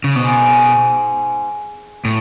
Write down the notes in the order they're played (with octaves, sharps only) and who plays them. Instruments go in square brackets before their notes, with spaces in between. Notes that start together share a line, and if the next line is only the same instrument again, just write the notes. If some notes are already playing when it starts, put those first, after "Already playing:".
[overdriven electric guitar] C#3
[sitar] G#2 [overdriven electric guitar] B2
[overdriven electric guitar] A2